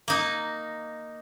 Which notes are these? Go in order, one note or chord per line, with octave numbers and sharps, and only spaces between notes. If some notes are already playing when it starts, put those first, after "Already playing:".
A#3 D#4